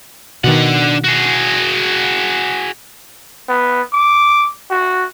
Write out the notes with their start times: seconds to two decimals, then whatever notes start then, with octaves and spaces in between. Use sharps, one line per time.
0.44 B2 D#3 D4 F#5
1.04 F#4 G#4
3.49 B3
3.93 D6
4.71 F#4